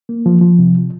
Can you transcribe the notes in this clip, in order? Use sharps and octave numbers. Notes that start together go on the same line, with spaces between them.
A#3
F3
F3
C3